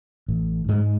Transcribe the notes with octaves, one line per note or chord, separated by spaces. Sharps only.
A1
G#2 G#3